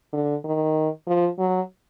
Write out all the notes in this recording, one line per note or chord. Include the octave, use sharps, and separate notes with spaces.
D3
D#3
F3
F#3